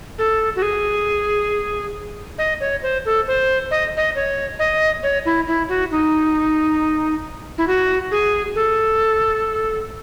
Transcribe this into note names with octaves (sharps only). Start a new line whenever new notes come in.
A4
F#4
G#4
D#5
C#5
C5
A4
C5
D#5
D#5
C#5
D#5
C#5
E4
E4
F#4
D#4
E4
F#4
G#4
A4